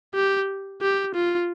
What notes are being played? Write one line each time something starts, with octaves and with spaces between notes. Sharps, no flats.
G4
G4
F4